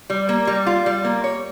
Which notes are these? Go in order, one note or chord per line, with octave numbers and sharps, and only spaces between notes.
G3
A#3
G3
F4
G3
A#3
C#5